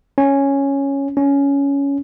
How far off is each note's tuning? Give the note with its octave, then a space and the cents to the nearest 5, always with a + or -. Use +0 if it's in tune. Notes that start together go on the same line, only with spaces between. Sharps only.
C#4 -5
C#4 +10